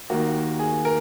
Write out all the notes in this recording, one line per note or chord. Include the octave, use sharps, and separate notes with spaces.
D#2 D#3 A#3 F#4
G#4
A#4